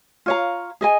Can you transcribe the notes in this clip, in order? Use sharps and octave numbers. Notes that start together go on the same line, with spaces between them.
F4 C#5 F5 A#5
G#4 D#5 G#5